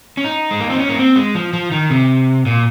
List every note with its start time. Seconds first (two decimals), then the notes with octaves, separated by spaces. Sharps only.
0.17 C#4
0.24 D#4
0.51 G#3
0.60 A#3
0.70 C4
0.80 C#4
0.89 A#3
0.98 C4
1.16 G#3
1.35 F3
1.53 F3
1.71 D#3
1.90 C3
2.46 A#2